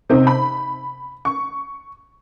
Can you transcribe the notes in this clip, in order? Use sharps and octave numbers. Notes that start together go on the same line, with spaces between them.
C3 C4 D#4
B5
C#6